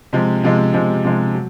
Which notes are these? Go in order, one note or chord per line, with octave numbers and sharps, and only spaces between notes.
C3 F3 G#3
C3 F3 G#3
C3 F3 G#3
C3 F3 G#3
F#3